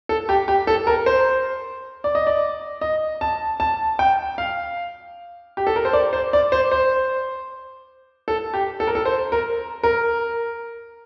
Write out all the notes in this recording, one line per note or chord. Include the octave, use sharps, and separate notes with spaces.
A4
G4
G4
A4
A#4
C5
D5
D#5
D5
D#5
A5
A5
G5
F5
G4
A4
A#4
C5
D5
C5
D5
C5
C5
A4
G4
A4
A#4
A4
C5
A#4
A#4